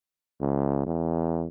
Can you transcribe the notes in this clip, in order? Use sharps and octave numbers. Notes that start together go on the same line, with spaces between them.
C#2
E2